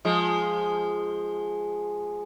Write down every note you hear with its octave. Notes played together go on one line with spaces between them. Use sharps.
F3 G#3